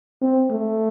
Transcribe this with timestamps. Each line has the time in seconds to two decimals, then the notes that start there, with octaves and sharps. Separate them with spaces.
0.21 C4
0.51 A3